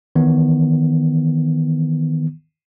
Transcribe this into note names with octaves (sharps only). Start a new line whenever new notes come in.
D#3 E3 B3